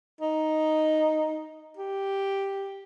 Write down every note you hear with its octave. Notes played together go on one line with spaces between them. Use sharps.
D#4
G4